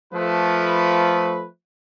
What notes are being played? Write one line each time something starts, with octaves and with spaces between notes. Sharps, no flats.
F3 A3 B4